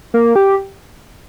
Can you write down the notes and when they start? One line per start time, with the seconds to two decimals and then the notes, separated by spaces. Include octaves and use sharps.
0.14 A#3
0.36 G4